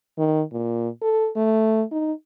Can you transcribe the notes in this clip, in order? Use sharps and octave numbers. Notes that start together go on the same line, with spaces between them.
D#3
A#2
A4
A3
D#4